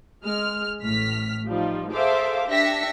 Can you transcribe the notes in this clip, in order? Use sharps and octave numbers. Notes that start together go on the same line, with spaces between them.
G#3 F6
A1 A2 F6 B6
F3 G3 D#4 F4
G#4 A4 C5 E5 F5 D6
D4 G4 E5 A#6 B6 C#7